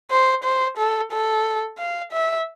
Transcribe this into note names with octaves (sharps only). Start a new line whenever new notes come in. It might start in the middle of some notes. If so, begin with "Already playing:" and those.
C5
C5
A4
A4
F5
E5